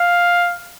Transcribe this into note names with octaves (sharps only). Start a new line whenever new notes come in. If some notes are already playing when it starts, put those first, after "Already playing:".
Already playing: F5